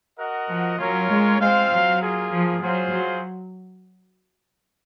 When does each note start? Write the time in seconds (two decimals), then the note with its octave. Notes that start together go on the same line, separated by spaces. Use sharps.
0.19 F#4 A#4 D#5 F#5
0.49 F3
0.79 F#3 C#4 F4 A#4 C#5
1.10 G#3
1.40 G#3 C4 F4 C5 F5
1.70 F#3
2.00 A#3 F4 G#4
2.31 F3
2.61 F#3 F4 G#4 C5 F5
2.91 F#3